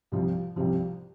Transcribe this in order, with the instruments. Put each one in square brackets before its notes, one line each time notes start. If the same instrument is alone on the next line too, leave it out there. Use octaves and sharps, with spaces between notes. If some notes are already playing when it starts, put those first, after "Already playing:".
[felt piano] C2 C3 F3
C2 C3 F3